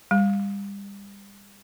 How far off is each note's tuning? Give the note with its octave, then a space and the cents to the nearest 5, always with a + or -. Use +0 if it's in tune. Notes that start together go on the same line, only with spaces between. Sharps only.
G3 +30